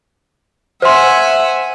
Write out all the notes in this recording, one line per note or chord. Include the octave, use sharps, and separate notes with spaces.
C5 E5 F#5 G#5 C6